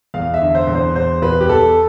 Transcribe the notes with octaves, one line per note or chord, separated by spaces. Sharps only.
E2 F5
E5
D3
C5
E2
C5
E2 C5
E2 B4
G4
E2 A4